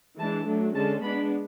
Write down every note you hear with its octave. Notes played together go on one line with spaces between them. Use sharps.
E3 G#3 D4 A5
F#3 A3 D4
D3 G#3 C#4 A5
G#3 B3 D4 B5